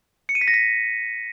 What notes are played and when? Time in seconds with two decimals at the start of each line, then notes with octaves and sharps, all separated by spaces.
0.29 C#7
0.35 D#7
0.41 B6
0.48 A#6
0.54 B6